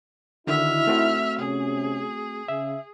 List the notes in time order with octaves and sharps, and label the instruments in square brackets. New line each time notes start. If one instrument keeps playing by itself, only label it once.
[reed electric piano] D3 D#3 F#4 [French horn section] D#4 E4 [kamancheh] E5 F6
[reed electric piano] A3 C4 F#4
[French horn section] C3 C#4 [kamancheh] G#4
[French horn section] C#3 [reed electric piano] E5